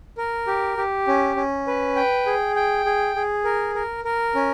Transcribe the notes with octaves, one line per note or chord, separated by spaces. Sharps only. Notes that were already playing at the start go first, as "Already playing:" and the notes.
A#4
G4
G4
C#4
C#4
B4
G5
G#4
G5
G#4
G#4
A#4
A#4
A#4
C#4